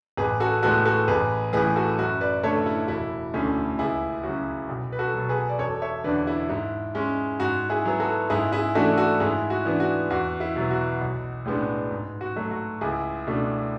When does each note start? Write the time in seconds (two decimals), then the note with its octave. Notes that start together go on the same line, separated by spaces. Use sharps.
0.17 A1 G#4 B4
0.40 F#4 A4
0.63 A2 G#3 B3 F#4 A4
0.85 F#4 A4
1.08 A1 G#4 B4
1.53 A2 E3 G#4 B4
1.76 F#4 A4
1.99 F#2 F#4
2.21 B4 D5
2.44 D3 A3 A4 C#5
2.66 E4
2.88 E1 E4
3.34 D2 D3 A3 C#4
3.79 C#2 E4 G#4
4.23 C#3 F#3 F#4
4.69 B1
4.92 B4
4.99 F#4 A4
5.14 B2 F#3
5.29 G#4 B4
5.49 D5
5.59 E1 A4 C#5
5.82 C#5 E5
6.04 E2 D3 B4 D5
6.27 E4
6.49 G#2 E4
6.95 G#3 C#4
7.40 G#2 F#4
7.70 E4 G#4
7.85 F#3 B3
8.00 F#4 A4
8.30 G#2 E4 G#4
8.52 E4 G#4
8.75 E3 A3 D4 F#4 A4
8.97 F#4 A4
9.20 G#2 E4 G#4
9.50 F#4
9.65 E3 B3 D4
9.80 F#4
10.10 E2 F#4
10.40 E4
10.56 B2 F#3 B3
10.71 F#4
11.01 B1
11.46 A2 G#3 B3 D4
11.91 G#2
12.21 F#4
12.36 F#3 A3
12.51 F#4
12.81 C#2 E4 G#4
13.27 B2 A3 D4